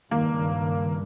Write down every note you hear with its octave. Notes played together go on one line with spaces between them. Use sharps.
C#2 G2 D#3 A#3